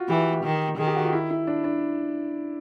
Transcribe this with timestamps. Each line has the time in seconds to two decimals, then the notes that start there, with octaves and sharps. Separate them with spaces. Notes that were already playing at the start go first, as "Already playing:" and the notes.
Already playing: F4 F#4
0.09 E3 G4
0.44 D#3
0.78 D#3 G#4
0.87 G4
0.96 F#4
1.04 F4
1.13 E4
1.30 E4
1.47 D4
1.64 D4